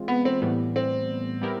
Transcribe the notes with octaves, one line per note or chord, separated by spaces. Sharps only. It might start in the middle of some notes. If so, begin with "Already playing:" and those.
Already playing: E3 G#3 C4 F4
B3
C4
A2 E3 G3 B3
C4
G3 B3 E4 G4 A#4